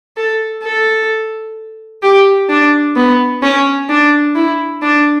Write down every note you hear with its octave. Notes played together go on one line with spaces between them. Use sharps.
A4
A4
G4
D4
B3
C#4
D4
E4
D4